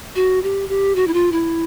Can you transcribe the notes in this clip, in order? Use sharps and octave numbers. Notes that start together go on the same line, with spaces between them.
F#4
G4
G4
F#4
E4
F4
E4